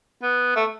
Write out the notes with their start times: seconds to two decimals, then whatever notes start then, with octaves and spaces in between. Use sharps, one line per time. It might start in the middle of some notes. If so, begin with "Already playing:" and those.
0.23 B3
0.56 A3